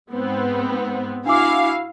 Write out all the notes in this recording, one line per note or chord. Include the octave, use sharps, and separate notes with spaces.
G#2 B3 C4
D4 E4 F#4 F5 G#5 D6